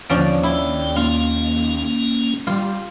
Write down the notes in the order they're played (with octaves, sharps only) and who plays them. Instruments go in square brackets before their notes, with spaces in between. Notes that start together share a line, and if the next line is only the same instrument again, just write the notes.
[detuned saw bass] D#2 [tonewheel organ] D3 [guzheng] F3 C#4 D4
[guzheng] E4 [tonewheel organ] D5 G5
[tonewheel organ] A#3 C#4 [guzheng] F4
[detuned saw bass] G3 [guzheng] F4